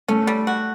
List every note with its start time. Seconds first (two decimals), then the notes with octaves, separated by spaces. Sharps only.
0.08 A3 C#4
0.27 G3
0.47 F#4